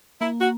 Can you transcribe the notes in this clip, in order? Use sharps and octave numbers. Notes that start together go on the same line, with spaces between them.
A#3 E4
F#4